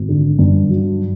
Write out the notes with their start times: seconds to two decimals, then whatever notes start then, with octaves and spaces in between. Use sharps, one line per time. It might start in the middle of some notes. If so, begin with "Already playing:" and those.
Already playing: G#1
0.09 D3
0.39 G2
0.69 F#3